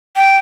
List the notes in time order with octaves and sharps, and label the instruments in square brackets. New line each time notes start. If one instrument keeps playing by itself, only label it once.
[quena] G5